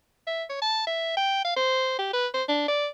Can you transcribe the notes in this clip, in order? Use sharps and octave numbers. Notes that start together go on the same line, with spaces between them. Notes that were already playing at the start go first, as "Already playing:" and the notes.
E5
C#5
A5
E5
G5
F5
C5
G4
B4
C5
D4
D5